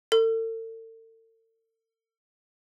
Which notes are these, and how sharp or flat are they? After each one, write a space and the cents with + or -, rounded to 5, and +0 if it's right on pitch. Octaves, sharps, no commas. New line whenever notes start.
A4 +40